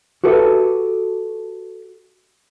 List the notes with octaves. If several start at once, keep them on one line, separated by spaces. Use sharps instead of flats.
F#4 G4 A4 B4 E5